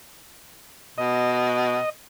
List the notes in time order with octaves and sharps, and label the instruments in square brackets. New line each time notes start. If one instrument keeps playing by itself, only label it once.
[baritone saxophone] B2 [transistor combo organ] D#5